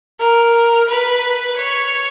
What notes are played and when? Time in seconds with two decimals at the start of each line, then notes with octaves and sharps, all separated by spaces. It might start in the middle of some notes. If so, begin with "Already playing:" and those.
0.20 A#4
0.89 B4
1.58 C#5